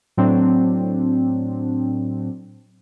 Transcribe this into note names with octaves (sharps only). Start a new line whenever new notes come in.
A2 F#3 C4 D4